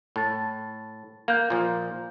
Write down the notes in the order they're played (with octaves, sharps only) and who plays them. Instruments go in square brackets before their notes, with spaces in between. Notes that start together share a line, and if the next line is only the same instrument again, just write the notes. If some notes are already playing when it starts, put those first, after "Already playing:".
[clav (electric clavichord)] A2 [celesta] A5 A6
[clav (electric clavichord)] A#3 [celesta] F5 G6
[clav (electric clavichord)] A#2 F3